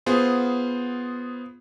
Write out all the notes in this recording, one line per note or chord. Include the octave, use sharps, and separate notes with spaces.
B3 F4 G#4 C5